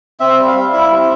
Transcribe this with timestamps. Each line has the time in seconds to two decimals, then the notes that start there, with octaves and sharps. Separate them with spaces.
0.20 C4 E5
0.38 G3
0.47 F5
0.55 G3
0.73 E4 E5
0.91 C4